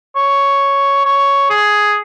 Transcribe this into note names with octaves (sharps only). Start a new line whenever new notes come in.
C#5
C#5
G#4